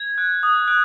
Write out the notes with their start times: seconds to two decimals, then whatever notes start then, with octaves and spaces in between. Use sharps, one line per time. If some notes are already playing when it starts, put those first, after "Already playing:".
Already playing: G#6
0.18 F#6
0.43 D#6
0.68 F#6